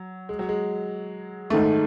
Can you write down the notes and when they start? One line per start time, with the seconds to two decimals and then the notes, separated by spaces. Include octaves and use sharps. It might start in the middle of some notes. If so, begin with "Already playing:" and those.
Already playing: F#3
0.29 G#3
0.39 F#3
0.49 G#3
1.50 G#2 D#3 A3